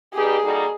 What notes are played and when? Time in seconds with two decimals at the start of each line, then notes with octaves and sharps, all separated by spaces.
0.13 G3 B3 D#4 G4 G#4
0.42 G3 A#3 D#4 F#4 A4